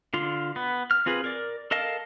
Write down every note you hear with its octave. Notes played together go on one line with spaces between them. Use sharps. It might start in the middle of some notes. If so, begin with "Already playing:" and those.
D3 F4
B3
F6
C4 F4 G#4 B4
A#4 D5
A4 A#4 D#5 F5 A5